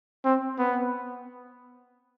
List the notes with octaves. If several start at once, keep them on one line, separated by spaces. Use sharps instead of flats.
C4
B3